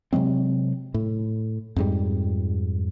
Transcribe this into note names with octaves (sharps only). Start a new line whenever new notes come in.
C3 F#3 G#3 C4
A2
F2 G#2 G3